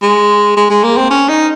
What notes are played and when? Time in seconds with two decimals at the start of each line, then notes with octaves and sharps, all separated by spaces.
0.02 G#3
0.57 G#3
0.70 G#3
0.84 A#3
0.97 C4
1.11 C#4
1.29 D#4